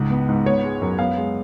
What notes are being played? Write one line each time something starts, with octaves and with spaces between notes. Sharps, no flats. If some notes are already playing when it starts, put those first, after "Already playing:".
Already playing: C#2 G#2
B3
G#2
B3 C#5
G#3
F#2
B3 F5
G#3